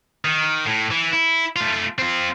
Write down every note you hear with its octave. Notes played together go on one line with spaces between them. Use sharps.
D#3
A2
E3
E4
A3 F4
C4 F4